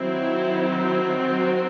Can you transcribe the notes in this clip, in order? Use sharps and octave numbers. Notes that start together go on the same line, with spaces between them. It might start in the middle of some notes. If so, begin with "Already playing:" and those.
Already playing: D#3 F#3 C4 E4
F#4